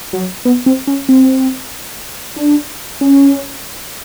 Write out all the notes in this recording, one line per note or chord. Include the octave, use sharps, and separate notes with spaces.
F#3
B3
C4
C#4
C4
D4
C#4